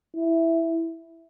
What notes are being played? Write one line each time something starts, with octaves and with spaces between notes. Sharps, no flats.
E4